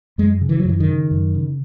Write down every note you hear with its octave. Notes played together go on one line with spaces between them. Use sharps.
F#2 G#3
C#3
E3
F#3
F#2 E3
D#3
C#3
F#2
C#3